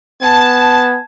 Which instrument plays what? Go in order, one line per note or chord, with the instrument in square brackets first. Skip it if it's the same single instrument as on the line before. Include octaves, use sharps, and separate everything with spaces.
[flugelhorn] B3 [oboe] G#5 [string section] A5